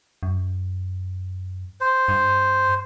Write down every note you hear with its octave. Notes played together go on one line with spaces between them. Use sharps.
F#2
C5
G2